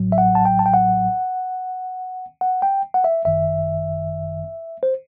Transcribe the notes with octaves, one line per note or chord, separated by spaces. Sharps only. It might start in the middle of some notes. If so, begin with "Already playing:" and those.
Already playing: A1 A2 F#3
E5
F#5
A5
G5
A5
G5
F#5
F#5
G5
F#5
E5
G1 F#2 D#3 E5
C5